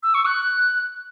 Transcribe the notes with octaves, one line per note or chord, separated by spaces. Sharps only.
E6
C#6
F#6